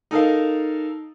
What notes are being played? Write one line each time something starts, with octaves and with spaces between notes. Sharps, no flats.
D#4 A4 A#4 F5